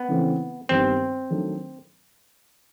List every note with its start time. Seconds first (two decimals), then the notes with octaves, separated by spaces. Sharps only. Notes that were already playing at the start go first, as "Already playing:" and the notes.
Already playing: B3
0.09 C#3 E3 A3 C4 E4
0.69 G2 D#3 G3 B3 C4
1.30 D#3 F#3 A3 D4